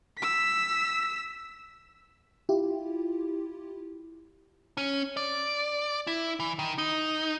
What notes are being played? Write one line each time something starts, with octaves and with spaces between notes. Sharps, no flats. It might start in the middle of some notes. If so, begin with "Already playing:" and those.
E6 B6
E4 F4 G4
C#4
D5
E4
E3
D#3
D#4